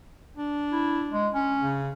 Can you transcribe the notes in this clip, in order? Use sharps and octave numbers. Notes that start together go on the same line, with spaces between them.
D4
E4
G#3
C#4
C#3